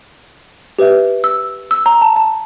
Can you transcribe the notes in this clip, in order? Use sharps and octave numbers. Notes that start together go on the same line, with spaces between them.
G4 B4 E5
E6
E6
A#5
A5
A5